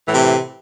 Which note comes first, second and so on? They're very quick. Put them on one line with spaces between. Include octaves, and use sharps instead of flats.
E3 A2 C3